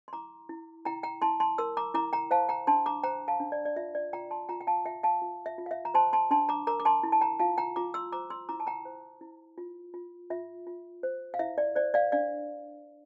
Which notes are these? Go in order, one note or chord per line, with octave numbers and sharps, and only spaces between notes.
C6
E4 A#5 D6
E4
E4 G5 A#5
G5 A#5
E4 A5 C6
A5 C6
A#4 C6 E6
A#5 D6
E4 A#5 D6
G5 A#5
C5 F5 A5
G5 A#5
D4 A5 C6
A#5 D6
C5 G5 A#5
F5 A5
D4
D5
D5
F4 E5
D5
F4 G5 A#5
A5 C6
F4 G5 A#5
G5
F5 A5
F4 E5 G5
F5 A5
F4
E5
F4
F5
E5
A#5
C5 A5 C6
A5 C6
D4 A5 C6
A#5 D6
A#4 A#5 D6
D6
A5 C6
E4
A5
G5 A#5
F4 F5 A5
G5 A#5
F4 A#5 D6
C6 E6
C5 A#5 D6
C6 E6
E4 A#5 D6
A5
G5 A#5
C5
E4
F4
F4
F4 E5
F4
C5
F5
E4 E5
D5
C5 D5
D5 F5
D4 D5 F5